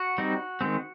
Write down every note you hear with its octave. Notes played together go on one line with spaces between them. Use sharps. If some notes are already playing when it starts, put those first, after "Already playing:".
Already playing: F#4
G3 C4 D#4
D#3 G#3 C4